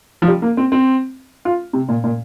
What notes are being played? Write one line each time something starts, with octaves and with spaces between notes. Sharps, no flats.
F3
G3
A#3
C4
C4
F4
C3
A#2
A#2